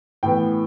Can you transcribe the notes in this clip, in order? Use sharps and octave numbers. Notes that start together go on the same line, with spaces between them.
A2 E3 B3 G5